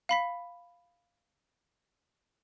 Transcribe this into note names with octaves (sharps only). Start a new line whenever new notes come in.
F5 B5 B6